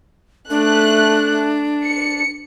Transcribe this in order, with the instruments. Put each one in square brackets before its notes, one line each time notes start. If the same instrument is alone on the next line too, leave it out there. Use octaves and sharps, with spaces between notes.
[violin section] A3 F#6 [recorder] D4
[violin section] C#7